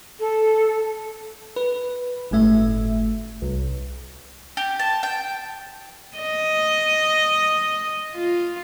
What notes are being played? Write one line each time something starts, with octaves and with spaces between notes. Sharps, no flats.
A4
B4
G1 A2 A3 E5
C2
G4
A5
G5
D#5
F4